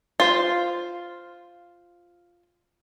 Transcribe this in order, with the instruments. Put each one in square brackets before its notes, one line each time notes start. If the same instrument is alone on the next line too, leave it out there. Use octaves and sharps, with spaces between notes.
[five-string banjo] F4 C5